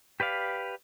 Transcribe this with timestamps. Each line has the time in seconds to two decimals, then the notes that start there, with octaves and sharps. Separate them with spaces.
0.20 G4 B4 D5 F5